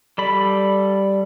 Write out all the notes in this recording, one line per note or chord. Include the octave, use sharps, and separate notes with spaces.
G3 A4 B5